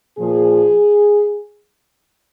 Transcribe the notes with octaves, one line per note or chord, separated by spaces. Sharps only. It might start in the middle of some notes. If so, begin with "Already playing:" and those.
A#2 F3 G#4